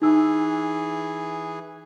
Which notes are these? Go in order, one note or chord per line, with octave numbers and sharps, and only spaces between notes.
E3 D#4 G#4 E6